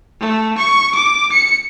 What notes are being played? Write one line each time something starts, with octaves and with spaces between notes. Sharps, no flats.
A3
C#6
D6
C#7